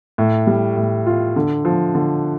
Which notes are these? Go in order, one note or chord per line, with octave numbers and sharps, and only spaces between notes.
A2
G3
A2
F4
D3
F3
D3